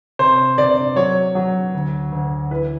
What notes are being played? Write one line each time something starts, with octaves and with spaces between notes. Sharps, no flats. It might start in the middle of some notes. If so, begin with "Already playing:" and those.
C3 C5
C3 D5
F#3 C#5
F#3
D2
D2
E3 B4